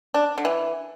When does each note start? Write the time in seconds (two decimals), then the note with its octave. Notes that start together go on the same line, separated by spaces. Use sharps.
0.14 D4
0.38 D3
0.45 E3